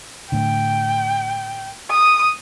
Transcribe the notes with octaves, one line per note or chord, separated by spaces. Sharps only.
A2 D3 G5
D#6